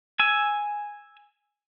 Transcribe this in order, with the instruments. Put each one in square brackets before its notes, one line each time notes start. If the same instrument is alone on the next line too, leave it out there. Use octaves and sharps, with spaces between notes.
[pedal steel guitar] G#5 E6